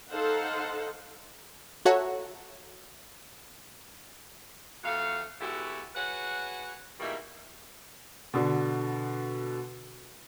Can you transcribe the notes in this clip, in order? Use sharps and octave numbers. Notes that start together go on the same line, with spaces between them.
D#4 A4 C5 F5 F#5
F#4 A4 C#5 E5 F#5 A#5
F2 A3 F#4 F5
B2 G#3 E4 F#4 G4 A4
F#4 G#4 B4 C#5 F#5
B2 D#3 G3 G#3 A#3 E4
B2 D3